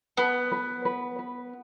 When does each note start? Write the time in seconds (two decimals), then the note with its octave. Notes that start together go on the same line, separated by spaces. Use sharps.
0.17 B3 B4
0.52 B4
0.85 B4
1.19 B4